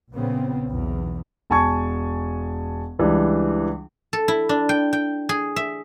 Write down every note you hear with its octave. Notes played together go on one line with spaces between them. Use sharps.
A#1 A#2 C#3 B3 C4
B1 E2
E1 G#5 A5 C#6 G#6
C#2 E3 G3 D4
A4
E4
D4
G5
G5
G#4
E5